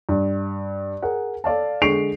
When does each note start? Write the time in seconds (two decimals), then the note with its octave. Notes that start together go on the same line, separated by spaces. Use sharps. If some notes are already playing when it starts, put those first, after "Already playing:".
0.09 G2
1.02 G#4 A#4 F#5
1.44 A4 D5 F5 A5
1.82 D3 G#3 C#6 C7 D7 F7